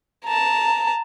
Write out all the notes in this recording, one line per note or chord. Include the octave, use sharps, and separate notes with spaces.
A5 A#5